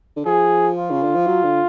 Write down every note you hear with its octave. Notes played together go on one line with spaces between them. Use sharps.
D3
F3 G#4
F4
C#3
D3
F3
F#3
D3